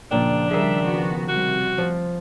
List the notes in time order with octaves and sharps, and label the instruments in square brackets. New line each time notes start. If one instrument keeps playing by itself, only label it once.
[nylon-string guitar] A#2 G5 [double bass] C#3 F3 [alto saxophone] D4
[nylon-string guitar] D#3 G#4 [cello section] G3 E5
[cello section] B3 F#4
[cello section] C3 G3 [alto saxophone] F#4
[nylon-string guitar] F3